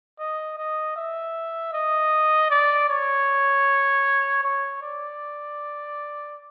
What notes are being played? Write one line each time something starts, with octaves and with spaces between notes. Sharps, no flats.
D#5
D#5
E5
D#5
D5
C#5
C#5
D5